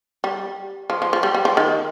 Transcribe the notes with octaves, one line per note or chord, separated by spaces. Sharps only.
G3
F3
F3
F3
G3
G3
F3
D#3